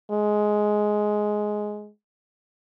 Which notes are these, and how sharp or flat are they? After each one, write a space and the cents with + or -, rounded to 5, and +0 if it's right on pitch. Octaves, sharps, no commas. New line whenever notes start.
G#3 +10